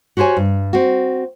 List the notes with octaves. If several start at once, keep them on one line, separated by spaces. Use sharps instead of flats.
F#4 G4 C5 C#5 G#5
G2
C4 F#4